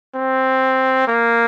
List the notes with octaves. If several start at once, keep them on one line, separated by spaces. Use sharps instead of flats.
C4
A#3